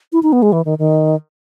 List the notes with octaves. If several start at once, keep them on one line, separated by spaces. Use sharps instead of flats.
E4
D#4
B3
G#3
E3
D#3
D#3